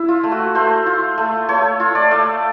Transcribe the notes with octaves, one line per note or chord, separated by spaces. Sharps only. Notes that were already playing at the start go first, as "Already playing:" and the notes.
Already playing: E4
F4
A3
F#4
A3 C5
F4
A3
A3 C#5
F4
D5
A3